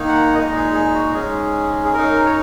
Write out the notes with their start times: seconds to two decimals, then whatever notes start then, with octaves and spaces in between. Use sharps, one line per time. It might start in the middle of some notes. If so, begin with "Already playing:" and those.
Already playing: D#3 A#3 D#4
0.08 F#5
0.35 A#2 G#3 D#4 D#5
0.55 G#4
0.74 G#4
0.95 F#4
1.14 G#2 G#3 C#4 G#4
1.84 G#4
1.93 F#2 F#3 D#4 A#4
2.26 C#5